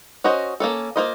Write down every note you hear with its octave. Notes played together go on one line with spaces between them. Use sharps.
C#4 F#4 C5 D#5
A#3 C#4 A4
A#3 F4 C5 D#5